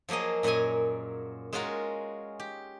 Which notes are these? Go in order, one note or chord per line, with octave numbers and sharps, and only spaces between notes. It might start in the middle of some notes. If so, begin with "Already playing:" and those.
F3 F#3 A#3 G#4 D#5
F#2 A#2 A#4 D#5 G#5
G#3 C#4 F4 F#4 A#4
G4